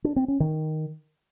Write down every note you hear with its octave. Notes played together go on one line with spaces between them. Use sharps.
D4
C4
C#4
D#3